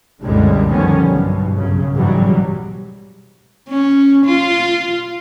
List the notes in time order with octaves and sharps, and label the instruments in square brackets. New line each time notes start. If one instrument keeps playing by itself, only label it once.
[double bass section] C2 F#2 A#2 D3 G3 G#3
D3 D#3 F3 G3 B3 C#4
B1 G2 B2
F#2 C#3
G#2 B2 E3 F#3 G3
[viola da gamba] C#4
F4